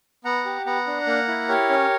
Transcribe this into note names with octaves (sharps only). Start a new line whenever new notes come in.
B3 F#5 A#5
G4
B3 F#5 A#5
D4
A#3
E4
G4 A#4 C#5
C#4